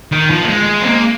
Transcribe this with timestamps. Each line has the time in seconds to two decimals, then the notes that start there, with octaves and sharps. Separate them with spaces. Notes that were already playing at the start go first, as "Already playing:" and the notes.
0.12 D#3
0.31 F3
0.44 A#3
0.49 G#3
0.82 C4
0.86 A#3